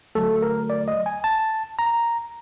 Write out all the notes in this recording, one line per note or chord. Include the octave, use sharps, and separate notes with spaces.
D3 F#3 A3 A4
A#4
D5
D#5
G#5
A5
A#5